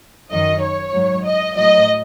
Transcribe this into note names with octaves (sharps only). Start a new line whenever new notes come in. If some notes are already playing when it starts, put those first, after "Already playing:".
F#2 D#3 F#3 D#5
C#5
G#2 F#3
D#5
A2 F#3 D#5